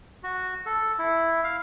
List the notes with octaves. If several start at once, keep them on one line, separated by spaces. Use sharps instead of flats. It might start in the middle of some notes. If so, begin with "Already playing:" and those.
F#4
A4
E4
F5